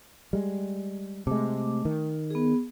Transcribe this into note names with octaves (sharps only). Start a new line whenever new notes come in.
G3 G#3
C3 G#3 A3 D6
D#3
B3 G#4